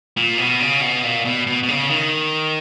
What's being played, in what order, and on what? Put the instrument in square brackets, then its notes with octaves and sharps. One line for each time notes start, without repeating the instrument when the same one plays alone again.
[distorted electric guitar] A#2
B2
C#3
B2
A#2
B2
B2
B2
C#3
D#3